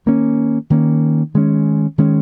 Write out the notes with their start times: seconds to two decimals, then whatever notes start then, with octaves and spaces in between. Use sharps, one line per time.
0.06 D#3 A#3 C#4
0.70 D#3 A#3 C#4
1.34 D#3 G#3 C#4
1.98 D#3 G#3 C#4